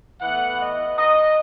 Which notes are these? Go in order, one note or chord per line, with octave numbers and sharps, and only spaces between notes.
A2 E3 B3 F#5
D#5
D#5